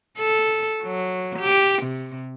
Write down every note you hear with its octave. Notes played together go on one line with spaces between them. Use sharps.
A4
F#3
G4
C3